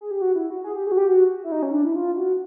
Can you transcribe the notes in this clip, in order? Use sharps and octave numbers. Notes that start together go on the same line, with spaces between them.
G#4
G4
F#4
E4
F#4
G#4
G4
G#4
F#4
G4
F#4
E4
D#4
C#4
D4
E4
F4
F#4